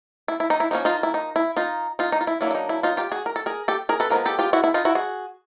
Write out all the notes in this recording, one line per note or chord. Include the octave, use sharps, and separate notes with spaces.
E4
E4
D#4
E4
F3 A#3 C#4 D#4
D#4 F4
E4
D#4
E4
D#4 F4
D#4 F4
D#4
F4
E4
F#3 A#3 D4 E4
E4
D#4
E4
D#4 F4
F4 G4
F#4 G#4
A#4
A4
G#4 A#4
G4 A4
G#4 A#4
A4 B4
F3 G#3 B3 A#4
G4 A4
F4 G4
E4 F#4
E4
D#4 F4
E4 F#4
F#4 G#4